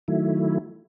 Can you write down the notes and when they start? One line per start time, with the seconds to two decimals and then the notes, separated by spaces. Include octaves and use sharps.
0.08 D#3 F#3 A3 E4